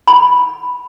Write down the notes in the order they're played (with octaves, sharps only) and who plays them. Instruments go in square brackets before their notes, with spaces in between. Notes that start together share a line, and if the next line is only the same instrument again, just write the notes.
[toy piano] B5